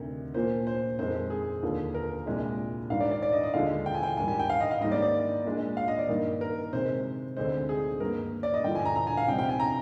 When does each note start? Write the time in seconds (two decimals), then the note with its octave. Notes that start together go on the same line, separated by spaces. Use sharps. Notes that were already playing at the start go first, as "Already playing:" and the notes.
Already playing: D2 C3 D#3
0.34 A#2 F3 A#3 C5
0.67 C5
0.99 F2 D#3 G#3 C5
1.30 G#4
1.62 D#2 D3 F3 A#3
1.94 A#4
2.26 C2 A#2 G#3 D4
2.90 G#2 D#3 G3 D4 F5
3.01 D5
3.11 D5
3.22 D5
3.32 D#5
3.43 D#5
3.54 D#2 D3 F3 G#3 F5
3.86 G5
3.94 G#5
4.03 G5
4.17 G#2 D#3 G3 G#5
4.28 G#5
4.39 G5
4.50 F5
4.60 D#5
4.71 F5
4.81 G#2 D#3 G3 A#3 D#5
4.92 D5
5.02 D5
5.45 A#2 G#3 D4
5.77 F5
5.88 D#5
5.99 D5
6.09 G2 D#3 A#3 D#4
6.41 A#4
6.73 C3 D#3 G#3 C5
7.37 D2 D3 G#3 C4 D#4 C5
7.69 G#4
8.00 G2 D#3 A#3 A#4
8.43 D5
8.54 D#5
8.64 G2 D3 F3 G5
8.75 G#5
8.85 A#5
8.96 A#5
9.07 G#5
9.17 F5
9.28 C3 G3 C4 D#4 G5
9.38 G5
9.49 G#5
9.60 A#5